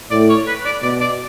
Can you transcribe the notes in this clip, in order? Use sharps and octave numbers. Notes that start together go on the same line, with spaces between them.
A2 D5
C#5
B4
D5
B2 D5
D5